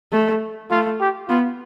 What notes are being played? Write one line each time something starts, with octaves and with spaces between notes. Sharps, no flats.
A3
A3 F4
G4
B3 F4